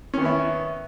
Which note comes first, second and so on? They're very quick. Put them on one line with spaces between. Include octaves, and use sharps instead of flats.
C#4 D#3 B3 E4